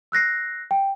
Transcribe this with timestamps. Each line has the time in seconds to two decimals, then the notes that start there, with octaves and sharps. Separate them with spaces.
0.12 E6 F#6 A#6 C7
0.71 G5